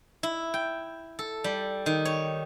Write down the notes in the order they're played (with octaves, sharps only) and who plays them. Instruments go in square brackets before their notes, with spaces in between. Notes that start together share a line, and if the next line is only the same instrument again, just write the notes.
[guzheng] E4
G5
A4
G3
D#3
C#5